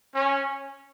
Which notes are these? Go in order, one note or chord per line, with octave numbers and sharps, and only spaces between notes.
C#4